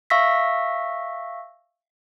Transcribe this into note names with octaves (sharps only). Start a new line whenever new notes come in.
E5 F5 C#6 E6 A#6 B6